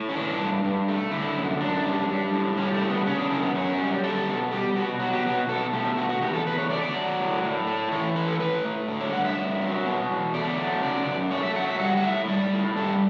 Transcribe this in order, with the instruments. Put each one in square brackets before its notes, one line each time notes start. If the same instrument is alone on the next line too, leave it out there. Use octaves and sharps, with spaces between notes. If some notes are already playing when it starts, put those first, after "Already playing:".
Already playing: [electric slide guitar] A2
C#4
E3 D4
G2
G2
A3
D3 E4
F#2
F#2 D4
G3
G3
A2
G3 C#4
A3
A2
B3
C#3 C#4
D4
F#2 E4
B3
F#2 C#4
G3
G3 A4
B2
G3 G4
B2 F#4
F#3 F#4
G4
B2 F#4
B2 A4
A3 G4
B2 F#4
F#4
E2 G4
A4
E2 B4
C#5
A3 D5
D5
F#3
A2
A2
A3
E3 C#5
A2 B4
A4
A2 B4
A3
D3
C#5
G2 F#5
E5
G2
F#3
B2
E2
A3 D5
F#3
C#3 D5
F#2
A3 C#5
E5
F#3 F#5
E5
G3 F#5
F#5
A2 E5
G3 D5
A2
G3 A4